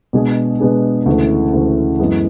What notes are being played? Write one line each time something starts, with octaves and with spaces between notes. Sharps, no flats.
B2 G#3 B3 D4 G#4
B2 G#3 B3 D4 G#4
D2 C#3 E3 A3
D2 C#3 E3 A3
F#2 E3 G#3 B3